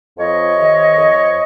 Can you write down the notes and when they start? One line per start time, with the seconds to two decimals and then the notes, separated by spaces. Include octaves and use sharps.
0.17 F2 C#5 D#5
0.56 C3 D#3
0.96 F2